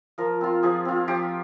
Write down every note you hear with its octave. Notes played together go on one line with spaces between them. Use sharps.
F3 A#4
C4 F4
F3 G#4
C4 F4
F3 G4